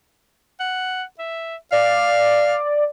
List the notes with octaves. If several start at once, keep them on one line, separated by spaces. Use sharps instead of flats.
F#5
E5
D5 F5